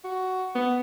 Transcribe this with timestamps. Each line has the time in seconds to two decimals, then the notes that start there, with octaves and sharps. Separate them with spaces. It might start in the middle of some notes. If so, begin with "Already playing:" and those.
0.04 F#4
0.55 B3